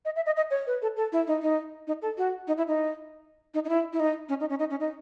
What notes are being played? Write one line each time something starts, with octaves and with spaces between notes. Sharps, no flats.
D#5
E5
D#5
D#5
C#5
B4
A4
A4
E4
D#4
D#4
D#4
A4
F#4
D#4
E4
D#4
D#4
D#4
E4
E4
D#4
C#4
D#4
C#4
D#4
C#4
D#4